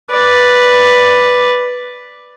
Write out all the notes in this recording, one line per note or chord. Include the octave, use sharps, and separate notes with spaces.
B4 D5